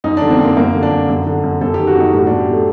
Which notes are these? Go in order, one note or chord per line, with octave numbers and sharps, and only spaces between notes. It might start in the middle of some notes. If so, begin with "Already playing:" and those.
F#2 D#4
D3 D4
C4
F#2 A#3
F#2 A#3
D3
D4
F#2
F#2
D3
F#2
F#2 A4
D#3 G4
F#4
F#2 D#4
A2 F#4
A2 D4
G4
A2 A3